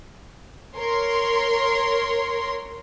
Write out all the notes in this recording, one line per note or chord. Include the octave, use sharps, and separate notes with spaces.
A#4 C#5 C6